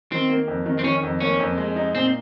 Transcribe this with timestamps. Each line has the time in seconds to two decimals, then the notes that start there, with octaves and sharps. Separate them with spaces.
0.12 D#3 C4
0.29 A#3
0.48 F2
0.66 D#3
0.79 C4
0.84 D#3 C#4
1.03 F2
1.20 A#3 C#4
1.40 F2
1.58 G#3
1.76 D#4
1.94 A#2 C4